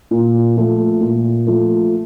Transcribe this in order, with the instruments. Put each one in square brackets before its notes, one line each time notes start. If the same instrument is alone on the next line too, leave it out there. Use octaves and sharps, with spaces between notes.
[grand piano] A#2
F3 A3
A#2
F3 A3